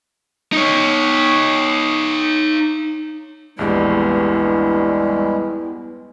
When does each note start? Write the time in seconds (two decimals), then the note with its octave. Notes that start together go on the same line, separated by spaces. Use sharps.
0.53 D#4 C#5
3.59 A#1 E2 G2 G3 G#3 B3 E4